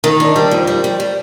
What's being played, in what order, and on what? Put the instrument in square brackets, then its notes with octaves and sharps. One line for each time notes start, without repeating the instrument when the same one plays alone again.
[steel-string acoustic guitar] D#3
D4
G3
F2
G3
G3
G3